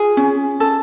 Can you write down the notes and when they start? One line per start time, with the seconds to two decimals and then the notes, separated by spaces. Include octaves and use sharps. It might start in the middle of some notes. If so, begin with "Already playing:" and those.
Already playing: F4 G#4
0.17 C#4
0.60 A4